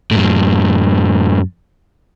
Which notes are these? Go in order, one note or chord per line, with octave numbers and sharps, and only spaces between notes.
F#2 A2